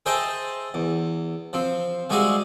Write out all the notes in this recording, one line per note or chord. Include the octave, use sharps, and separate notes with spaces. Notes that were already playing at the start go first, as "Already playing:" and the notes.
G#4 C5 D#5 E5 G5 A5
E2
F3 C4
G3 G#3 F#4 G#4 E5 F5